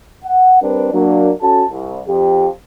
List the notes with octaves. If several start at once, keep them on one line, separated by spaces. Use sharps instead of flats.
F#5
G3 C4 D4 A#4 B4 D5
F#3 A#3 D4
C#4 F#4 A4 A5
C2
F2 G4